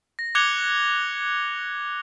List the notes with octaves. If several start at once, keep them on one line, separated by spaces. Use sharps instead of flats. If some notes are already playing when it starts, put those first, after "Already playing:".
A#6
D6 F#6 G#6 C#7 F7 G7